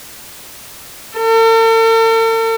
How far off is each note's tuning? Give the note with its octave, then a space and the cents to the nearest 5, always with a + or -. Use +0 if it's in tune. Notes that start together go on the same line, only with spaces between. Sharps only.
A4 +45